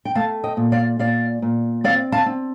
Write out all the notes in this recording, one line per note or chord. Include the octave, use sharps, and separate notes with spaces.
G5
A3 F5 A5
D#5 G5
A#2
D5 F5
A#2 D5 F5
A#2
C4 D5 F5
F5 A5
C4